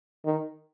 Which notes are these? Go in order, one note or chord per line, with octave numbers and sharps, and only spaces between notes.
D#3